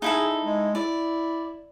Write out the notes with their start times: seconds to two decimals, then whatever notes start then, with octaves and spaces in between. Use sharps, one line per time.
0.02 D#4 E4 G#4 A4
0.44 G#3
0.75 E4 D5